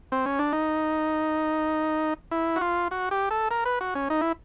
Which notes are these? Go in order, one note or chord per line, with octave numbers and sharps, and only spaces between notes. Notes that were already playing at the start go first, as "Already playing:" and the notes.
C4
C#4
D4
D#4
E4
F#4
F4
F#4
G4
A4
A#4
B4
F#4
C#4
D#4
E4